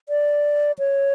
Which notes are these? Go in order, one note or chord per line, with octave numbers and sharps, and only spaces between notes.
D5
C#5